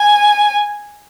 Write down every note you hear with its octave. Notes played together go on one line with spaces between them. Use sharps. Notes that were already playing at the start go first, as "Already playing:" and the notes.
Already playing: G#5